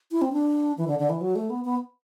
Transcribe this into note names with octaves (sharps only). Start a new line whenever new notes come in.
E4
C4
D4
E3
D3
D3
E3
F#3
A3
B3
B3